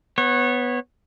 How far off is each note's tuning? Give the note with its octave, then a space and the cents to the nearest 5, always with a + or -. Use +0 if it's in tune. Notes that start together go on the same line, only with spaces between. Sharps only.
B3 +0 C#5 -25